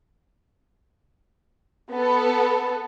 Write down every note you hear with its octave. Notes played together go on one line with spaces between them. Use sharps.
B3 A4